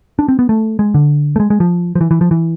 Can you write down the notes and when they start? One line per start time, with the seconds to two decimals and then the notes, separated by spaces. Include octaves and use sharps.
0.19 D4
0.29 C4
0.39 B3
0.49 A3
0.79 G#3
0.94 D3
1.36 A3
1.40 G#3
1.50 G#3
1.60 F3
1.95 F3
2.01 E3
2.11 E3
2.21 F3
2.31 E3